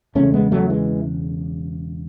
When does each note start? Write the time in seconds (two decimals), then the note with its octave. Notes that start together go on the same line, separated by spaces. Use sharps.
0.15 E1 E2 C#3 A3 C#4
0.34 G#3 B3
0.52 F#3 A3
0.70 E3 G#3